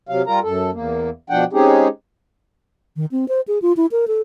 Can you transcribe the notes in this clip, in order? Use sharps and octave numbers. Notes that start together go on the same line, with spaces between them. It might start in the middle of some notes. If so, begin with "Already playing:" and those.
C3 F#3 F5
G3 F4 A#4 A#5
F#2 A4
E2 A#3
B2 F3 D4 F#5 G5
G#3 C4 C#4 D#4 G4 G#4
D#3
C4
C5
G#4
F4
E4
A#4
A4